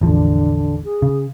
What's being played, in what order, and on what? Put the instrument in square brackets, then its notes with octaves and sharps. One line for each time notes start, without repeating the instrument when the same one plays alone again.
[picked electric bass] A1 E2 F3 [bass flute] D3
[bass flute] G#4
[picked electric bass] C#3